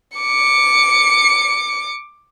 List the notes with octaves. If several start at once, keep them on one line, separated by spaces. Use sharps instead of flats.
D6 C#7